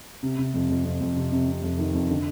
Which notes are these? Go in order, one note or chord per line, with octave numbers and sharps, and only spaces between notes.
C3
C3
F2
F2
F2
F2
C3
C3
C3
F2
D#3
F2
D3